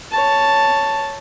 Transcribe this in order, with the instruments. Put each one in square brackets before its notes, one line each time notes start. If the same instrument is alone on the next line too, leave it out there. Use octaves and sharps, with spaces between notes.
[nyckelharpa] C#5 A5